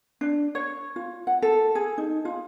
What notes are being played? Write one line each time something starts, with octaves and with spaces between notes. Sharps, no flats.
D4
C#5
F4
F#5
A4
G#4
D#4
F4